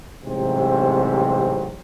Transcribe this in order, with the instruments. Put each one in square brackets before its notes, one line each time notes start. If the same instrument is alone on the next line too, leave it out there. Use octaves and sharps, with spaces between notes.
[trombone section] A1 G#2 C3 F#3 G3 C4